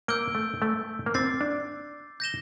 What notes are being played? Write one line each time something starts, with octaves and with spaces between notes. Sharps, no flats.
A#3 E6 G6 D7 G7
A3
A3
A#3
C4 D6 A6 C7
D4
G6 A#6 E7 G7